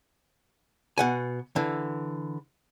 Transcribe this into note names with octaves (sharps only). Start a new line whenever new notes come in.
B2 F#5 G#5
D3 E3